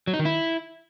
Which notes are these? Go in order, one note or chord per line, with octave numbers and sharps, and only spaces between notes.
F#3
D#4
D#3
E4